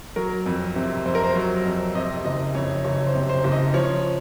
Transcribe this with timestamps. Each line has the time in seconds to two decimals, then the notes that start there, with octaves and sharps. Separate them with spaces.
0.16 F#3 A#4
0.46 F2
0.76 C3
1.06 F2 C5
1.15 A#4
1.24 C5
1.35 F#3
1.65 F2
1.95 C3 D#5
2.25 F#1 D#5
2.55 F2 C#5
2.84 F#1 C#5
3.07 C5
3.15 C3
3.29 C5
3.44 F#1
3.52 D#5
3.74 F3 C#5